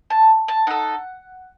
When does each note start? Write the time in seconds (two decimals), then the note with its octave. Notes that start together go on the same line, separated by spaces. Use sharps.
0.10 A5
0.48 A5
0.67 D#4 A4 F#5